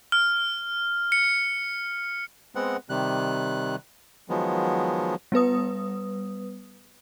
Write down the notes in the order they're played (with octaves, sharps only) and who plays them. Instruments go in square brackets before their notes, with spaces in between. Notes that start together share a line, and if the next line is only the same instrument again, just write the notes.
[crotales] F6
C#7
[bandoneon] G#3 B3 C4 F#5
C3 D#3 G3 F#6
D#3 F3 F#3 G#3 B3
[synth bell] G3 B3 B4 D#6